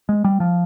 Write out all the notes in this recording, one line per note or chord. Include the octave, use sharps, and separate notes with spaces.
G#3
G3
F3